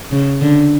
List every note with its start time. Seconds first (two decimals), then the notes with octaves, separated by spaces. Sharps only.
0.12 C#3
0.41 D3